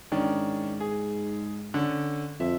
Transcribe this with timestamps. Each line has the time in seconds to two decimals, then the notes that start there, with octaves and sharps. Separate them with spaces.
0.12 G#2 D#3 C#4 D4
0.80 G#4
1.74 D3 C#4
2.40 F2 E5